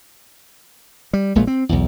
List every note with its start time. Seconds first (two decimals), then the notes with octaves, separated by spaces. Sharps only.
1.13 G3
1.35 A#1 A#2 G#3 A3
1.47 C4
1.69 B1 E2